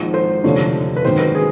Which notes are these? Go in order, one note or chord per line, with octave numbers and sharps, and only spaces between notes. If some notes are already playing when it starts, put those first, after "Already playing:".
Already playing: G#1 G#2 F3
C5
F1 D#2 D3 F3 C#5
B4
G#1 F#2 D#3 C5
B4
G#4